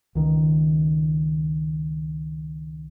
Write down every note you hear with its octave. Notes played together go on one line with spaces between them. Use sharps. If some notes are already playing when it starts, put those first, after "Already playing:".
C#2 D#3